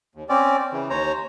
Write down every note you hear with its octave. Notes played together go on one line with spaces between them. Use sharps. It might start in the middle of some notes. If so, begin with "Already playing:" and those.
D#2
C4 C#4 D5
C#3 E3
D#2 C5 C#5 A#5